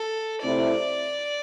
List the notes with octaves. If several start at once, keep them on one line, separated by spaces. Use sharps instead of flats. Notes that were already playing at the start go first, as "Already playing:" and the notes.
Already playing: A4
C3 A3 C4 E4 D5